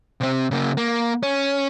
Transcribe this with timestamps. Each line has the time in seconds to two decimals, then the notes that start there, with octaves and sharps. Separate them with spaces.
0.21 C3 C4
0.51 C#3 A#3
0.77 A#3
1.23 C#4